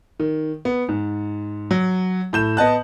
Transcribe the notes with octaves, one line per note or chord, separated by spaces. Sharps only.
D#3
B3
G#2
F#3
A2 G6 E7
B3 D#5 A5 F#6